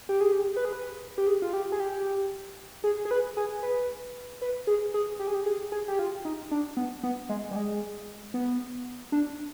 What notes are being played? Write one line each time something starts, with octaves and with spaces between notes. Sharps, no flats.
G4
G#4
G4
B4
G#4
B4
G4
G#4
F4
G4
G#4
G4
G#4
G#4
B4
G#4
B4
B4
G#4
G#4
G4
G#4
G4
G#4
G#4
G4
F4
D#4
D4
B3
B3
G#3
G3
G#3
B3
D4